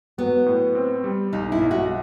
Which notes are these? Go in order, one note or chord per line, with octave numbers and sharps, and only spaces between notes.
F#3 B3
A2
C4
G3
B1 D#4
E4
B1
F#4